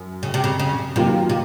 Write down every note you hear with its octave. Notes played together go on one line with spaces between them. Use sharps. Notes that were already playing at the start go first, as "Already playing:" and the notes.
Already playing: F#2
C#3
C3
C#3
C#3
C3 D#3 F#3 A#3 F4
C3